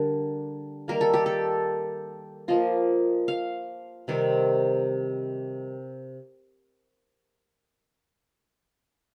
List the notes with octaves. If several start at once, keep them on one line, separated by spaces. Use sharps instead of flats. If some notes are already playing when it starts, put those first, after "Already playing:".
Already playing: D3 G3 D4 A#4
D#3 G3 A#3 A#4
A4
G4
A4
F3 A#3 F4 D#5
F5
C3 D#3 G3 C4